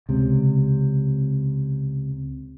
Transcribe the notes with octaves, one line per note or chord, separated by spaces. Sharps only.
C#2 C3